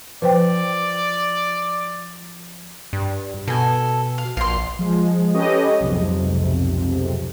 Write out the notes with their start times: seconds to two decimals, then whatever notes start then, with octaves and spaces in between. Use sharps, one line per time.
0.22 F3 B4 C5 D5 G5
2.93 G2
3.48 B2 A4 G#5
4.18 F5
4.37 A#1 F5 C6
4.79 F3 G#3
5.35 C#4 G4 A4 B4 C#5 D#5
5.80 B1 F2 G#2 C3